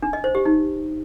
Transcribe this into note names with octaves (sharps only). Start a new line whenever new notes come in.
D4
D#5
C5
G4
D#4